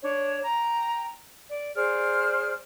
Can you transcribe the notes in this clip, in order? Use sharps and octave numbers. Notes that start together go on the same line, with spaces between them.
D4 C#5
G5 A#5
D5
G#4 C5 D5 F6